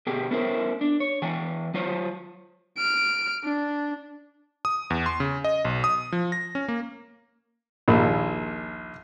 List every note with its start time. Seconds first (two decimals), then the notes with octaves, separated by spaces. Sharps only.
0.07 B2 G4 G#4 G5
0.31 B3 C#4 E4 A#4 C5
0.81 D4
1.00 C#5
1.22 E2 E3 G5 G#5
1.74 F#3 F4 C5 C#5
2.78 F6 D7
3.44 D4
4.65 D#6
4.90 E2
5.06 C6
5.20 C#3
5.44 D#5
5.65 B1
5.84 D#6
6.12 F3
6.32 A#6
6.55 C#4
6.68 A#3
7.88 A#1 D#2 A#2